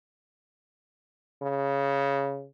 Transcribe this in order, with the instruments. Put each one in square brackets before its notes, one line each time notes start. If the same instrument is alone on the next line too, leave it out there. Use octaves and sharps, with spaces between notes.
[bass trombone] C#3